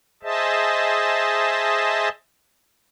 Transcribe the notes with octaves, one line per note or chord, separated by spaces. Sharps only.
G#4 C5 D#5 E5 A5